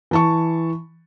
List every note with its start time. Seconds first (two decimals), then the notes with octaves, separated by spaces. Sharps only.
0.11 E3 A5 C#6